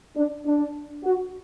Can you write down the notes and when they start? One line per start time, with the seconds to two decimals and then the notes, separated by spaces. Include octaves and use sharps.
0.16 D4
0.46 D4
1.04 F#4